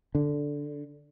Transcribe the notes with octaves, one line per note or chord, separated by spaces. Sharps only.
D3